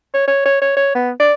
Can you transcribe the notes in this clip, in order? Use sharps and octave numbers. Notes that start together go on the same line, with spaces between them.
C#5
C#5
C#5
C#5
C#5
B3
D5